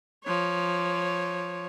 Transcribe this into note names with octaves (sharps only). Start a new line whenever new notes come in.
F3 C#5